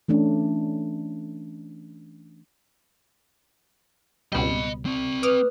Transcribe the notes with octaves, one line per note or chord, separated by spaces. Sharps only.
E3 A3 C#4 D4
C#2 B2 G3 D#5 B5
C4 D5
B4 D6 D#6 F6